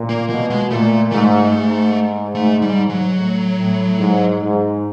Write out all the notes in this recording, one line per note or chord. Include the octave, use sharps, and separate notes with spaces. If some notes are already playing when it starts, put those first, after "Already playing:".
Already playing: A#2
A#3
B2 A#3
G#3
A#2 A3
G#2 A3
G#2
A3
G3
F#3
A2
A2
G#2
G#2